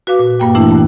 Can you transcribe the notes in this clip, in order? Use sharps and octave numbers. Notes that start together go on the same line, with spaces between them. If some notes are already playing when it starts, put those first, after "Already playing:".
F#4 B4 F5 D6
A#2
G2 A#3 G5
A#2 E3 A3 D4 E4
D#2 A5